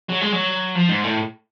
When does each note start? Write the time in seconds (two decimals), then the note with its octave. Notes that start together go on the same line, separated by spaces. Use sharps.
0.09 F#3
0.21 G#3
0.32 F#3
0.75 F3
0.89 G#2
1.04 A2